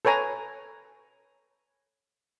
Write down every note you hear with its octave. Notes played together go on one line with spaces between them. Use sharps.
A4 B4 C#5 G#5 A#5